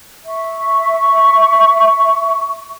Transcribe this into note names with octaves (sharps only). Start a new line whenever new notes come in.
E5 C#6